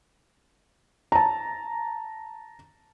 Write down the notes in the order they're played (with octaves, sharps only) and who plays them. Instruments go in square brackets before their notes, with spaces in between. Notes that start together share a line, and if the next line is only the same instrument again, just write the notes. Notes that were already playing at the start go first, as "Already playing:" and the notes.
[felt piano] A5 A#5